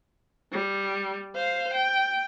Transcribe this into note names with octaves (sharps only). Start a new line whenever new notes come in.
G3
C5 F5
G5